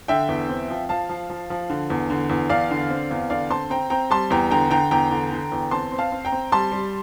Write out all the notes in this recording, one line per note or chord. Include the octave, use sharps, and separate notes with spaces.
D3 E5 G5
E2
C4
F3
F3 F5 A5
F3
F3
F3
D3
E2
D3
E2
E2 D5 F5
D3
C4
E2
D3 D5 F5
C4 A5 C6
C4 G5 A#5
C4 G5 A#5
G3 A5 C6
E2 G5 A#5
D3 G5 A#5
D3 G5 A#5
E2 G5 A#5
D3
D3
E2
C4 A5 C6
C4
F5 A5
C4
G5 A#5
C4
G3 A5 C6
G3